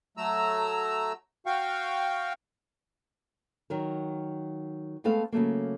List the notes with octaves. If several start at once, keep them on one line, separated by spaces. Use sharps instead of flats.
F#3 A3 A#5 E6
F#4 F5 G5 C#6
D#3 F#3 A#4
G#3 A3 B3 C4 A4 F5
C#3 F#3 A3 A#3